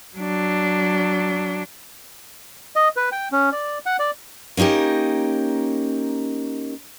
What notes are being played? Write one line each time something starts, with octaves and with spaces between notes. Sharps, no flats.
F#3 D4
D#5
B4
G5
C#4
D5
F#5
D5
A#3 C#4 D#4 G4 A#4